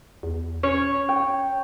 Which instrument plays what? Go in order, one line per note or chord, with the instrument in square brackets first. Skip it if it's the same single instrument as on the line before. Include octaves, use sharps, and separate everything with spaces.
[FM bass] E2
[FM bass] C#4 [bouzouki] C#5
[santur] G5